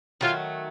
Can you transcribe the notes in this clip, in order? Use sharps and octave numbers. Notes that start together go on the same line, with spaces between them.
D#3 F#3 A3 F4